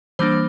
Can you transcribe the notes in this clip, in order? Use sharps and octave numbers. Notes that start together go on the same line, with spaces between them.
E3 G3 A#3 D4 C5